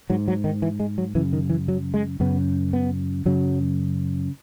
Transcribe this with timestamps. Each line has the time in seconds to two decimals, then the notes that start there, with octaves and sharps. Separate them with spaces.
0.10 G#2 F#3
0.28 F#3
0.44 D#3
0.62 E3
0.80 G#3
0.98 F#3
1.15 F#2 C#3 E3
1.33 D#3
1.50 E3
1.68 F#3
1.94 G#3
2.20 F#2 C#3 B3
2.73 B3
3.25 F#2 C#3 F#3